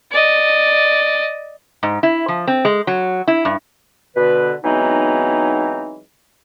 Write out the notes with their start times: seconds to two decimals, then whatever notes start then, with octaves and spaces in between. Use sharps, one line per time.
0.12 D5 D#5
1.83 G#2
2.03 E4
2.28 F3
2.47 C4
2.65 G#3
2.87 F#3
3.27 E4
3.45 G2
4.17 B2 D3 B4
4.64 E3 F#3 G#3 B3 C4 D#4